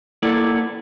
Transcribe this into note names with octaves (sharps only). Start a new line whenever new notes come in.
A#3 B3 E4 A4 D5